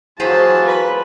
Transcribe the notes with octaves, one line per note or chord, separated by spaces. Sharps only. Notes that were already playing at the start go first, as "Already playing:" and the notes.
E3 F#3 F4 G#4 C5 A5 B5
B4